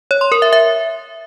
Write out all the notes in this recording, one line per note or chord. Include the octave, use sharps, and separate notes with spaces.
C#5
C6
A#4
E5
E5